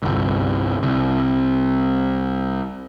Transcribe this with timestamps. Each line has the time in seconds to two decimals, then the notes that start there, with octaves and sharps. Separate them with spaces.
0.03 G1 C2
0.83 C2